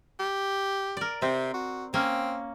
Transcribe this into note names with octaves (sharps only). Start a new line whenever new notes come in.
G4
A#4 D5
C3 C4
F#4
A#3 C4 C#4